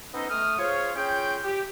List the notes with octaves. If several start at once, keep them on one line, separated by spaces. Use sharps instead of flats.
B3 C#4 D#4 A4 C5 D#5
A3 D#6 F6
F4 G#4 C5 C#5
C#4 F4 G#4 C#5 G5
G4